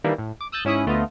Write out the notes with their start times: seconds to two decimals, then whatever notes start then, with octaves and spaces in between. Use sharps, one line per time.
0.04 D#3 E3 G3 A#3 D4
0.18 A2
0.41 D6
0.52 D#6 E6 F#6 G6 A6
0.65 G#2 C#4 E4 E5 D#6 F#6
0.86 D2 A3 B3 F4 D#5